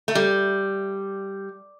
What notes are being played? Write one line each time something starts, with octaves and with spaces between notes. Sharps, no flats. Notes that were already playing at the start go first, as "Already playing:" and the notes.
A3
G3